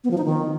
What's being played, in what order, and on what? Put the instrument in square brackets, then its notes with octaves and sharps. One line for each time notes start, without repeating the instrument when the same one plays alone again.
[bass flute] B3
F3
D#4
D#3